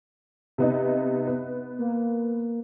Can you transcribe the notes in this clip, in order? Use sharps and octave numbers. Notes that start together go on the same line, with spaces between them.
C3 B3 D#4
B3
A#3